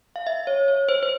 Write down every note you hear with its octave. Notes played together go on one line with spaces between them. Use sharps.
F5
E5
C#5
C#5
C5
C5